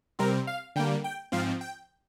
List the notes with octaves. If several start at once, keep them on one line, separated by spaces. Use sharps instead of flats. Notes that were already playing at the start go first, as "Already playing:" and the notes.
C3 G3 C4 A#4
F5
D3 G3 A#3 G5
G5
G#2 F3 C4 F5
G5